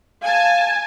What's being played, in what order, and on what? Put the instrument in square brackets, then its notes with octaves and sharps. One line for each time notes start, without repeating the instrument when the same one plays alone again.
[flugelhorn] F5 [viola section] G#5 A5